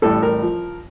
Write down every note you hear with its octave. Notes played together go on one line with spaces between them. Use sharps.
A1 A2 G3 A4
A#4
F3